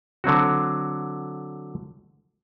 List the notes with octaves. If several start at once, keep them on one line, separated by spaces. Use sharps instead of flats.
D3 F#3 C4 F#4